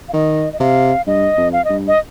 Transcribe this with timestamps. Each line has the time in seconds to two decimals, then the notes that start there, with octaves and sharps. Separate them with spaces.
0.09 F5
0.14 D#3 D#5
0.53 D#5
0.60 C3 F5
1.07 G2 D#5
1.38 F2
1.53 F5
1.65 G2 D#5
1.88 D#5